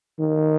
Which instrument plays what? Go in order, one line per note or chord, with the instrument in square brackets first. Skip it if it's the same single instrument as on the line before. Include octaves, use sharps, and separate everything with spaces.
[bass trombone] D#3